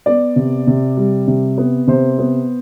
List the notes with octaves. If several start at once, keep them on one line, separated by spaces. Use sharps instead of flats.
B3 D5
C3
C3
G3
C3
B3
C3 C5
B3